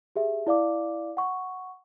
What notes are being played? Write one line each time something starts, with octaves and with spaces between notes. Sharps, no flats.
G4 G#4 E5
E4 D5 F5 D6
F#5 C#6